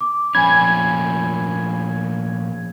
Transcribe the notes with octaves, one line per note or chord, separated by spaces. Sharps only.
D6
A#2 F3 C#4 G#5 B5 G#6